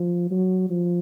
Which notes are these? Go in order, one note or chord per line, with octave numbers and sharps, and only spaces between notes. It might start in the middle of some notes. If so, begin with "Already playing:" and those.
Already playing: F3
F#3
F3